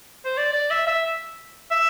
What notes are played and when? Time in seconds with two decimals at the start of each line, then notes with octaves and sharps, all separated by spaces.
0.25 C5
0.37 D5
0.53 D5
0.70 E5
0.87 E5
1.71 E5